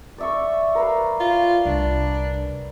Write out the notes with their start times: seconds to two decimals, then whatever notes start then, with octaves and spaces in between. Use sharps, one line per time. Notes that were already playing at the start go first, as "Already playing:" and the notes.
0.18 D5 E5 C#6
0.75 A#4 B4 F5
1.20 F4
1.66 C2 D4